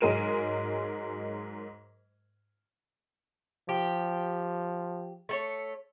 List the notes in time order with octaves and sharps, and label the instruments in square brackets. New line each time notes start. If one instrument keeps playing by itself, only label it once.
[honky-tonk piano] G#2 F#3 G#3 A#4 D#7 E7
[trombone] F3 [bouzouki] G4
[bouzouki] A3 A4 C#5